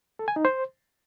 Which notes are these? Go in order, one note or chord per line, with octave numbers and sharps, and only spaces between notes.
A4
G#5
D#4
C5